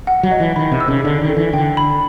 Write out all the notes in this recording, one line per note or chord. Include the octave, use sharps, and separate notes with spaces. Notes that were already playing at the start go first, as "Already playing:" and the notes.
F#5
F#3
D#5
E3
D#3 B5
C3
E6
C#3
D3 D5
D#3
A4
E3
D3 G5
B5